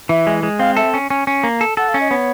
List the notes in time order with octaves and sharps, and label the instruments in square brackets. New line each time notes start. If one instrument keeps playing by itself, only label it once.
[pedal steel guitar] E3 [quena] E5
[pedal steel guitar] G#3
G#3
[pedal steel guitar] C4 [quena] F5
[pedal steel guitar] A4 [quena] E5
[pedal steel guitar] C#4
C#4
C#4
A#3
A4
[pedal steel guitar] A4 [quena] F#5
[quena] F5
[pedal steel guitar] C#4
[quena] D#5
[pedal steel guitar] B3 [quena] C#5